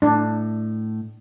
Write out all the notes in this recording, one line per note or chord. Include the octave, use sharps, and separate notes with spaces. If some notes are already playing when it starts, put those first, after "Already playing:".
A2 D4